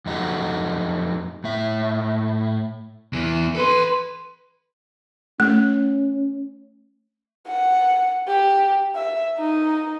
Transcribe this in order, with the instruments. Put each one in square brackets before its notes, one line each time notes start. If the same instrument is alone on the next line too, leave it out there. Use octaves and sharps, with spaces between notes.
[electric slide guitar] F2 F#3 D#4 F#4 G4 A4
A2 E5
[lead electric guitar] E2 E3
[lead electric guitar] A4 C6 [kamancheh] B4
[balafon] A3 [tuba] C#4
[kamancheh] F#5
G4
E5
D#4